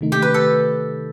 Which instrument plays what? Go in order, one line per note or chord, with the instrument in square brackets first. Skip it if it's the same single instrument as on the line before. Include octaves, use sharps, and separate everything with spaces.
[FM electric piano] C3 D#3 A3 D#4
[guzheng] G4
B4
A4